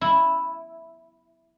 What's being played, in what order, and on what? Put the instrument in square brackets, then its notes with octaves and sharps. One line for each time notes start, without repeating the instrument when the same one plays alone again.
[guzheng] E4